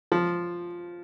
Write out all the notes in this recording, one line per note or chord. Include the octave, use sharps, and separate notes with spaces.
F3